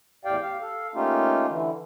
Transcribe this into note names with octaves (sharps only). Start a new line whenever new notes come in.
E2 A2 G4 D5 F5 G5
G4 F5
A4 F5
A3 A#3 C#4 D#4 F4 G4
D3 E3